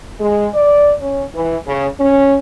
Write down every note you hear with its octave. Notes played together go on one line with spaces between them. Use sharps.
G#3
D5
C#4
E3
C#3
C#4